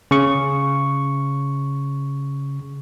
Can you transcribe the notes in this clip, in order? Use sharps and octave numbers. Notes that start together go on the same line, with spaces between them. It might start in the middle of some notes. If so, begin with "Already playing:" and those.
C#3 C#6